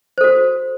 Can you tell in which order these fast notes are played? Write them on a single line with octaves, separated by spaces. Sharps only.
C5 A4 F#4